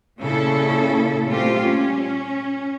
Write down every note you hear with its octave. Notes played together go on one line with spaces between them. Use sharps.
A#2 C#3 C#4 E4 A4
A#2 G3 A3 C4 F4 G4
C#4